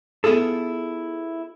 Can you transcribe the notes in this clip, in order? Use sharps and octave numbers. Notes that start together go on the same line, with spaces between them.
B3 E4 F4 G#4 A4